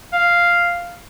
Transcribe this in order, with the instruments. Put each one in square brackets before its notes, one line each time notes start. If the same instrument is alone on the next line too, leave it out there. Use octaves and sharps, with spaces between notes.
[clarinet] F5